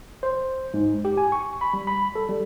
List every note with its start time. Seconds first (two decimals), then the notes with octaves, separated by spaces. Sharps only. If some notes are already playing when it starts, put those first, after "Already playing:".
0.23 C5
0.74 G#2
1.05 G4
1.18 G#5
1.32 C#6
1.61 B5
1.73 G3
1.87 B5
2.15 A4
2.29 G3